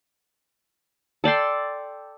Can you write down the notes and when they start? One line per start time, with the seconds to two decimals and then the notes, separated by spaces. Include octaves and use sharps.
1.24 A4 D5 G5 C6